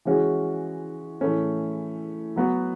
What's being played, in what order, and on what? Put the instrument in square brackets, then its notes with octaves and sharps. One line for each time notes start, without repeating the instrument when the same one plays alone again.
[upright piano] E3 G#3 C#4 F#4
A2 E3 A3 C#4
F#3 B3 F#4